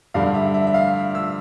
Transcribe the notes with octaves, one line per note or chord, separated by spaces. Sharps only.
G2 D3 G3 D4 F5
E5
E5
E5
F5
E6